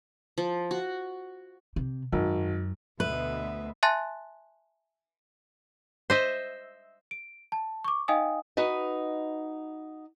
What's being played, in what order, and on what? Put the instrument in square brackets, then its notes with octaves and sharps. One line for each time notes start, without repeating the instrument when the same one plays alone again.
[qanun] F3
F#4
[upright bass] C3
[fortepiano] G#1 [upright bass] F#2
[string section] D2 B2 [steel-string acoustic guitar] B4 [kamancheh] E5
[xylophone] E5 G#5 A5 C6 F#6 A6
[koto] C5 D#5 E5
[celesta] D7
A5
C#6 D6
D#4 D#5 F5 G5 G#5 D#6
[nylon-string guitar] D#4 F#4 B4 D#5